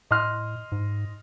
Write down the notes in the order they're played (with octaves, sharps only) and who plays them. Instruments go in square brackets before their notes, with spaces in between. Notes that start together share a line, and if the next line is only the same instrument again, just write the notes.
[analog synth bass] A2 [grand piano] D#5 C6 F6
[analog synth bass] G#2